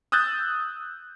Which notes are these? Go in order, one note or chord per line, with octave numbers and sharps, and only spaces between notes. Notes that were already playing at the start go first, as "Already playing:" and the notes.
D#6 E6 F#6 G6 A6